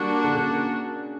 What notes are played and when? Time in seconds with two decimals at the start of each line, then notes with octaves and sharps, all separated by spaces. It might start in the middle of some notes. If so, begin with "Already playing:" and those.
Already playing: G3 A#3 D4 F#4
0.24 D3
0.33 C#3